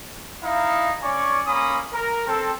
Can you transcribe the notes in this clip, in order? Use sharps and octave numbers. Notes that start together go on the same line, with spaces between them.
D#4 E4 F5
C#4 D5 G#5 C#6
A#3 C#4 B5 D#6
A#4
C4 A4